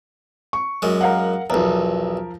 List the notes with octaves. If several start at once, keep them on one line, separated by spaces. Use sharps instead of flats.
C#6
F#2 G#3
A#4 F5 F#5
B1 E2 F3 A#4